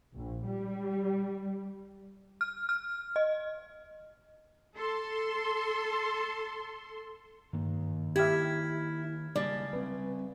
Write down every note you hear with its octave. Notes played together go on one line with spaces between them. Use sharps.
A#1
G3
F6
F6
D#5
A4 C6
G2 D#3 A#3
E4 G4 E5 F6 G#6
C#3 G3 A#3 D5
G3 C4 B4